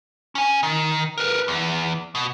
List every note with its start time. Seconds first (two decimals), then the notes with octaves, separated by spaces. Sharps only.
0.35 C#4 G#5
0.63 D#3
1.18 A#4 B4
1.48 E2
2.15 B2